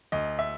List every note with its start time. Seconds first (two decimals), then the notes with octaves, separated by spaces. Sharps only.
0.12 D2 D#5
0.39 E5